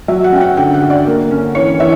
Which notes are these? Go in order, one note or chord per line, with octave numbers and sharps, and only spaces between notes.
F#3 E5
F#5
C#4 G5
F#5
D3 G5
F#5
D3
D5
A#3
C#4
E3 C#5
E3 E5